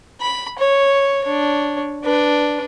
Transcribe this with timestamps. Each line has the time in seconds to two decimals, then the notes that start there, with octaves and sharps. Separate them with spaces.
0.21 B5
0.59 C#5
1.24 D4 C#5
2.04 D4 B4